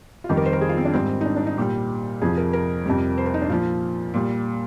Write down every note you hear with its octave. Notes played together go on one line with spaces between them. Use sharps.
F4
F2 D#3 G3 G4
A#4
C5
A#4
G#4
F4
C4
D4
G#2 G3 C4
D#4
D4
D4
D#4
A#2 G3 G4
F2 C3 F3 G#4
A#4
A#4
F2 C3 G3
C5
A#4
D#4
D4
A#2 F3 F4
A#2 G3